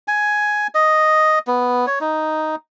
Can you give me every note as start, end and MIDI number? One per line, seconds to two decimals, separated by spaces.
0.08 0.67 80
0.75 1.39 75
1.47 1.86 59
1.87 1.99 73
2.01 2.55 63